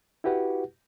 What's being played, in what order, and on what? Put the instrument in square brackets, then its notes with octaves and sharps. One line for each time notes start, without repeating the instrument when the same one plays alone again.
[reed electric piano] E4 F#4 G4 B4 F#5